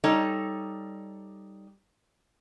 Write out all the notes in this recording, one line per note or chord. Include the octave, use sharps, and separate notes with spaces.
G3 D#4 A4 C#5